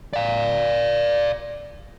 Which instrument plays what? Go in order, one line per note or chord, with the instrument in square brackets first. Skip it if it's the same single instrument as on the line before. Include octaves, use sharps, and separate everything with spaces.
[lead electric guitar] D5 F5